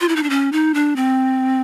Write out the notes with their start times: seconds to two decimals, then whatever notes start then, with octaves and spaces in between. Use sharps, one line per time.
0.01 F4
0.09 E4
0.16 D#4
0.23 D4
0.30 C#4
0.52 D#4
0.74 D4
0.96 C4